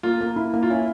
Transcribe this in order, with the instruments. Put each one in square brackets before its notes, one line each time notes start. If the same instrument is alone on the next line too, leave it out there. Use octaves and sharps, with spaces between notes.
[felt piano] A#3 [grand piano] F4
[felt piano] A#3
E4
A#3
[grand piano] F4
[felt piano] C#4 [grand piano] E4